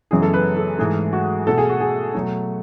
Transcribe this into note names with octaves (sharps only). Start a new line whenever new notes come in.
F#2 C#3 E3 G#3 B3 G#4
A4
B4
A4
G#2 E3 A3 G#4
F#4
B2 A3 A4
G#4
F#4
G#4
B2 F#3 A3